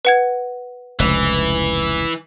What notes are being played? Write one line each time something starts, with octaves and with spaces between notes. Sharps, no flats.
B4 F#5 G#6
F1 C#2 E3